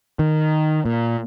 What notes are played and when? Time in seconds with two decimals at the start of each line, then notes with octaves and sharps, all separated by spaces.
0.19 D#3
0.85 A#2